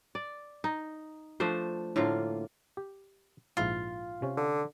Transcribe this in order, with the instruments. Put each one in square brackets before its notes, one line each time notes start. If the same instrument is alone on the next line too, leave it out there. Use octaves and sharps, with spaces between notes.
[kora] D5
D#4
F3 A3 D4 C5
A2 D3 A#3 F4
[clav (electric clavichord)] G4
[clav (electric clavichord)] A#1 G#2 E4 [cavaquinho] F4
[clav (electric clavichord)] C3 C#4
[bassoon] D3